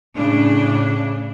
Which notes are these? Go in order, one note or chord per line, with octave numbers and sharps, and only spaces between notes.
A2 C#3 D4